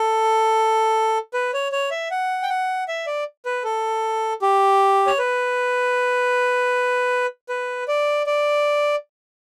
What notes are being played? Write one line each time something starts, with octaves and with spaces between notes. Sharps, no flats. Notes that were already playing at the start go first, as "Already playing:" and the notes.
Already playing: A4
B4
C#5
C#5
E5
F#5
G5
F#5
E5
D5
B4
A4
G4
C#5
B4
B4
D5
D5